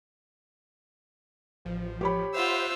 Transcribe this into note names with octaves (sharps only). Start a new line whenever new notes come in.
A1 F3
G4 C#5 B5
F4 C5 E5 F#5 E6